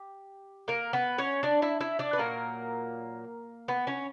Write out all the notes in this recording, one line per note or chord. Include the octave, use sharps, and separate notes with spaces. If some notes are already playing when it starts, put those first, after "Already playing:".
Already playing: G4
A#3 A#4
B3 B4
C#4 C#5
D4 D5
E4 E5
E4 E5
D4 D5
B4
A#2 F#3 A#3 A#4
B3 B4
C#4 C#5